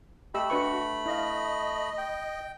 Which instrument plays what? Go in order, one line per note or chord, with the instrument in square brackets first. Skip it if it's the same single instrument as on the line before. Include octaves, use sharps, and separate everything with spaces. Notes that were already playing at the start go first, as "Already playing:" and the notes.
[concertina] A3 B5 [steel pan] G4 D#5 E6
[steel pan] D4 B4 C#6 [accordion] F#4
[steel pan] E4 F5 [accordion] D#5
[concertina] G5